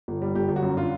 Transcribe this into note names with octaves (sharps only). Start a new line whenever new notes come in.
G1
G3
G1 G4
G1
F#4
F#2
D3 F4